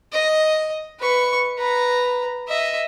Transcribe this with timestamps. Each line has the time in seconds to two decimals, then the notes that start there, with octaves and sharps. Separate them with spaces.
0.12 D#5
1.00 B4 C#6
1.58 B4 A#5
2.48 D#5 E5